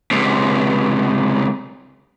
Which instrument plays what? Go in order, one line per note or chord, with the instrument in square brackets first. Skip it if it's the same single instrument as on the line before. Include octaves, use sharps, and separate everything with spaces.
[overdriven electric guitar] C#2 C3